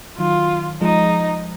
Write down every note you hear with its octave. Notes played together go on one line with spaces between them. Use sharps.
D#3 F#3 F4
F3 G#3 D#4